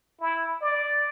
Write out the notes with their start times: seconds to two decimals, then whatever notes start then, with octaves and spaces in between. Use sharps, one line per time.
0.21 E4
0.62 D5